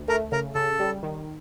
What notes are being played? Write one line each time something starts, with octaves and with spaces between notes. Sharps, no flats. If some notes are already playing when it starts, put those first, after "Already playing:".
Already playing: D2
A3 A#4
C#3 A#4
C#3 A4
G3
D#3